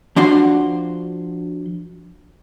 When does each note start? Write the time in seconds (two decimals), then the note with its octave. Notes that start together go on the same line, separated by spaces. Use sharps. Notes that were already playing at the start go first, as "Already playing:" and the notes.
0.16 F3 D4 F#4 C6